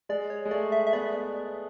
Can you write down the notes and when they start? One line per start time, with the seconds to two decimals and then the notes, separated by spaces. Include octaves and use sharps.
0.09 G#3 D5
0.30 C#5
0.45 G#3
0.51 A3 D5
0.72 E5
0.87 E5
0.93 B3 D5